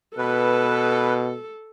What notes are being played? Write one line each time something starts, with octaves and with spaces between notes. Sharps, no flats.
B2 A4 B4